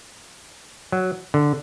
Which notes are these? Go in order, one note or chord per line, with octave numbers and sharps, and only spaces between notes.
F#3
D3